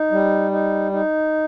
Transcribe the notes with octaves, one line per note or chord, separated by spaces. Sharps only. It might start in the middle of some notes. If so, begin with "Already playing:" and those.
Already playing: D#4
G3
D#4
D#4